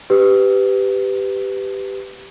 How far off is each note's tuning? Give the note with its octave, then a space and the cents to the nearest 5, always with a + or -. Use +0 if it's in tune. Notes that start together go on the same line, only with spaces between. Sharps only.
G4 +0 B4 +20